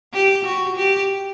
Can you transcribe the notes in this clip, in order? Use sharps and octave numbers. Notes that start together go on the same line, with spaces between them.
G4
F#4
G4